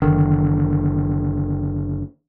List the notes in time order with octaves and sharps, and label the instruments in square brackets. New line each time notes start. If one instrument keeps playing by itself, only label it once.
[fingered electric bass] F#1 B1 D3 [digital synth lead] D#3